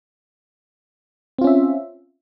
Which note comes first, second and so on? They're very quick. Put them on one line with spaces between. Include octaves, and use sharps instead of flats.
C4 F4 C#4 E5